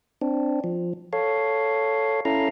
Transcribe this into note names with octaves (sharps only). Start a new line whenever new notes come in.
C4 D4
F3
A4 C#5 F5
C#4 E4 A4 F5 A#5